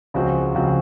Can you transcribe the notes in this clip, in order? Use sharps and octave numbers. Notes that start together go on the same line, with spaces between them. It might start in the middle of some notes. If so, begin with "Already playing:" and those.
C#2 C#3 F3 C4 F#4
C#2 C#3 F3 C4 F#4